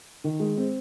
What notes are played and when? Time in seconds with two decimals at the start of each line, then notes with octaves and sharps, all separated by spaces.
0.24 D#3
0.40 G#3
0.57 C4